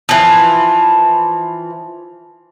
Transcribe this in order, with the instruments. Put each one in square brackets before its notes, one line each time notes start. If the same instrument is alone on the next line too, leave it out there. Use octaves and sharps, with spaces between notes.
[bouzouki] E3 F3